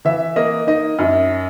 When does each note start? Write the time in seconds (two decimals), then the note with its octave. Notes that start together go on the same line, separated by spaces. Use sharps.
0.05 E3 E5
0.36 A#3 D#5
0.67 D#4 D#5
0.99 F#2